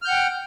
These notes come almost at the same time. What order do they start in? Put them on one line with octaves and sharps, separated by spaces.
F6 G6 F#5 G5